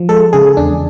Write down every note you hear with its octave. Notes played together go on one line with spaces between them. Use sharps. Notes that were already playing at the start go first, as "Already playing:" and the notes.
Already playing: F3
G#3 A4
C#3 G#4
E2 D4